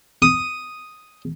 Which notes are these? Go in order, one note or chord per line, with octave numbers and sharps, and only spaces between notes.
D#6